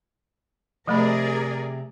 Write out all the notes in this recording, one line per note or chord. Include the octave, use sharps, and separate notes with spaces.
C3 F3 A3 G#4 A#4 D5 B5